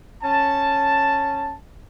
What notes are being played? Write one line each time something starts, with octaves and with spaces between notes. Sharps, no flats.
C#4 A5